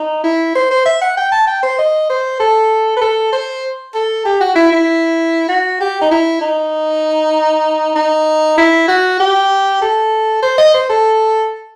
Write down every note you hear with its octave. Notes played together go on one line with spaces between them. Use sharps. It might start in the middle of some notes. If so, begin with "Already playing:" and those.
Already playing: D#4
E4
C5
C5
E5
F#5
G5
A5
G5
C5
D#5
C5
A4
B4
A4
C5
A4
G4
F#4
E4
E4
F#4
G4
D#4
E4
D#4
D#4
E4
F#4
G4
A4
C5
D#5
C5
A4